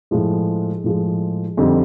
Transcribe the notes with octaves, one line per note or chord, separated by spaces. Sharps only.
A2 F3 G#3
A2 F3 G#3
F2 D3 G3 C4 D#4